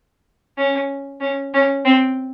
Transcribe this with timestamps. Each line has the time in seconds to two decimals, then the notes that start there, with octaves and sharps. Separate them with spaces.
0.57 C#4
1.21 C#4
1.54 C#4
1.85 C4